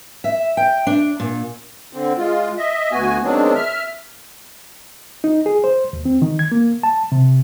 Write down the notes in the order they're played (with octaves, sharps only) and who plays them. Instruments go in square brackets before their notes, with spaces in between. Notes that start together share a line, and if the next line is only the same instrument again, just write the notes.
[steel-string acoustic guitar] E5
G5
D4
A#2
[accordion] D3 C4
G#3 F4
D#5 E5
D2 B3 F#4 G#5
D#3 F#3 G#3 B3 C4 D4
E5 F6
[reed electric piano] D#4
G#4
C5
D#2
C4
D#3
G#6
A#3
A5
C3